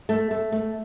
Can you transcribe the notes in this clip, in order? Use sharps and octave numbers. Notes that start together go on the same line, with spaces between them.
A3
A3
A3